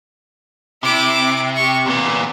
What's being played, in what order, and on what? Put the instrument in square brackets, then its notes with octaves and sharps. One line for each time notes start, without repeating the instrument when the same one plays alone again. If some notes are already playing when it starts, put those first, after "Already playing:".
[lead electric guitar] C3 [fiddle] E4 D6
[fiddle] G4 C#6
[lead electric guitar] E2 A#2 [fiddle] B3